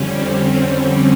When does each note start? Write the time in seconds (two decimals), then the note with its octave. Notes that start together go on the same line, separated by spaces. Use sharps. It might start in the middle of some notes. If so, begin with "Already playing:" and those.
Already playing: F2 D3 G3 C#4
0.12 C4